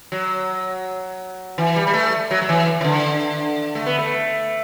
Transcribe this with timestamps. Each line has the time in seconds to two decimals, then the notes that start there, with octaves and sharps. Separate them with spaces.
0.12 F#3
1.58 E3
1.76 G3
1.87 G3
1.94 A3
2.31 F#3
2.42 F#3
2.49 E3
2.81 E3
2.84 D3
3.75 A3
3.86 B3
3.98 A3